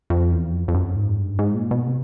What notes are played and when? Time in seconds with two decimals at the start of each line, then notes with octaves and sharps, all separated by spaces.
0.10 F2
0.31 E2
0.53 F2
0.68 F2
0.74 F#2
0.96 G#2
1.17 G2
1.39 G#2
1.55 A#2
1.71 B2
1.87 C3